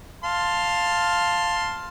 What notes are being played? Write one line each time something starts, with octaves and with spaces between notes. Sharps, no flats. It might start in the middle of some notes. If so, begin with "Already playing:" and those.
F5 A5 C6